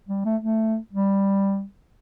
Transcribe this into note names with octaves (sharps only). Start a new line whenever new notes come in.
G3
A3
A3
G3